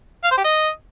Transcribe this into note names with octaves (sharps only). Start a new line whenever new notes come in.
F5
C5
G4
D#5